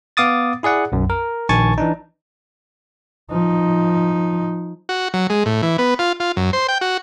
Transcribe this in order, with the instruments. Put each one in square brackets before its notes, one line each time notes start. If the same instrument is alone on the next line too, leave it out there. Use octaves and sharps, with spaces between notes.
[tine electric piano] B3 F5 D6 D#6 A6
E4 G#4 D5 F#5
B1 F#2
A#4
A#1 D#3 G#5 A5 C#6 A6
E3 D4 D#4
[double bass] F3 D#4
[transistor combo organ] F#4
F#3
G#3
A2
E3
B3
F4
F4
F#2
C5
G5
F#4